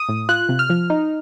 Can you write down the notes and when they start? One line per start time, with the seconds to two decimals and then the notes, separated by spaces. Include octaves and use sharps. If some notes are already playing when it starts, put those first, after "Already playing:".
Already playing: D#6
0.09 A2
0.29 F4 F#6
0.49 C3
0.59 F6
0.70 F3
0.90 D#4